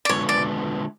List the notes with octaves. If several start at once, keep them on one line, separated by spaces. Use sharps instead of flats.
D5
D3 G#3 B3 D4 F4 C#5
D5